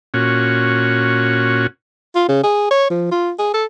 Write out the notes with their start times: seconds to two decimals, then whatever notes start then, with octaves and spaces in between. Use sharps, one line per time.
0.14 A#2 C#4 F#4
2.15 F4
2.29 C#3
2.44 G#4
2.71 C#5
2.90 F3
3.11 F4
3.39 G#4
3.54 A4